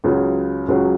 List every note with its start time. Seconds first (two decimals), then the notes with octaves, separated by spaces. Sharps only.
0.04 C#2 C#3 F#3 C#4
0.68 C#2 C#3 F#3 C#4